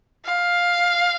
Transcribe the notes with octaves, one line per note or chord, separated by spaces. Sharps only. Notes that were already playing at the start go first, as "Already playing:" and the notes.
F5